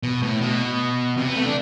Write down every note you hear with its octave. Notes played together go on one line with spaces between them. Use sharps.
B2
A2
B2
C3
B3
A3
D4